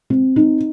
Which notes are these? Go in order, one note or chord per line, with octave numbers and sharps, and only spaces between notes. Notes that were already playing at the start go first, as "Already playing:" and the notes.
C4
D#4